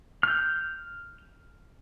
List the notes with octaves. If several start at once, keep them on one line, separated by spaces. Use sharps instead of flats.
F6 G6